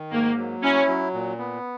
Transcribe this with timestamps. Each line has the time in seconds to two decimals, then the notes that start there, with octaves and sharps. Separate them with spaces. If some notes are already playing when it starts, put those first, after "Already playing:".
Already playing: D#3
0.12 G#2 A#3
0.38 F#3
0.62 C#4 E4
0.88 F#3
1.13 A#2
1.38 B3